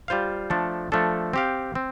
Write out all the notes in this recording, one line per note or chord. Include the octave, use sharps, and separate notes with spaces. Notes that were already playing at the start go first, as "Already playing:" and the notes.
G3 F4 C5 F5
F3 A3 D4 A4
F3 A3 D4 A4
C4 G4 F5
C4